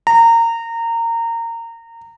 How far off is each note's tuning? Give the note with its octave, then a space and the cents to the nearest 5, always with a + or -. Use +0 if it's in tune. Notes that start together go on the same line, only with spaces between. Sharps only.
A#5 -20